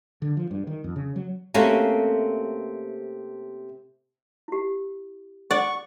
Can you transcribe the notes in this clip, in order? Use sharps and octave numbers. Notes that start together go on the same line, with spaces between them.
D3
F3
G2
D#3
F2
C#3
F#3
C3 A3 A#3 C4 C#4 F#4
E4 G4
D5 F#5 C#6